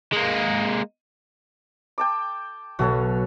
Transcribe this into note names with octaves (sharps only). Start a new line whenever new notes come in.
G#3 A#3
G5 A5 D6
B1 B2 F#4 A4 C#5